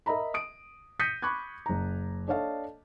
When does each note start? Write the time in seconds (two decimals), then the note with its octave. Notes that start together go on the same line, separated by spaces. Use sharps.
0.06 A#4 D#5 E5 A#5 B5
0.34 D#6 D7
0.99 D#6 G6 A#6 B6 C#7 D#7
1.22 B5 C#6 D6 F#6 G#6
1.66 F#1 A#5
2.28 D4 A4 C#5 D#5 F5 A5